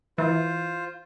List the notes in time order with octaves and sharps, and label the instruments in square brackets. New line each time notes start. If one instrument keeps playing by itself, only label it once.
[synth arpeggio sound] E3 [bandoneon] F4 C5